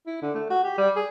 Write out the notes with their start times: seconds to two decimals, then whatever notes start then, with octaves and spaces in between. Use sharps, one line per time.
0.07 E4
0.22 D3
0.34 A3
0.50 F#4
0.64 G4
0.78 G3
0.96 G#4